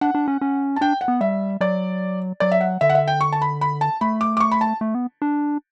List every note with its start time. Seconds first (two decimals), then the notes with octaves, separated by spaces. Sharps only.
0.01 D4 F#5
0.15 D4
0.28 C#4
0.41 C#4
0.76 A5
0.81 D4 G5
1.01 F#5
1.08 B3
1.21 G3 E5
1.61 F#3 D5
2.40 F#3 D5
2.52 E5
2.61 F#5
2.81 D3 E5
2.90 F#5
2.95 E5
3.07 G5
3.21 C#6
3.32 A5
3.42 B5
3.61 B5
3.81 A5
4.01 A3 B5
4.21 D6
4.37 D6
4.40 C#6
4.51 B5
4.61 A5
4.81 A3
4.95 B3
5.22 D4